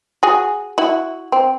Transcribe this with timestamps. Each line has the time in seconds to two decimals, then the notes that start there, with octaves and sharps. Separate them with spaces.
0.23 F#4 G#4
0.78 E4 F#4
1.32 C4